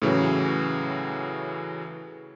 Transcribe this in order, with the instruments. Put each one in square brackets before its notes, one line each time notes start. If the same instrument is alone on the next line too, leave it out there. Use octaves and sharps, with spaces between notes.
[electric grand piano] A2 C#3 E3 F#3